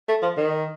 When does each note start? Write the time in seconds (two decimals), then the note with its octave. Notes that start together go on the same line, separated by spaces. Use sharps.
0.09 A3
0.23 F3
0.37 D#3